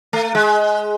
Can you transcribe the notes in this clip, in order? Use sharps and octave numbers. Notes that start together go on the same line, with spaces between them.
A3
G#3